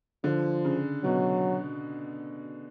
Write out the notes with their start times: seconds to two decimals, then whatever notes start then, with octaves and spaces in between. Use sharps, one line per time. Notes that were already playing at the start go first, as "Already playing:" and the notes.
0.24 D3 F3
0.65 C#3
1.04 B2 F#3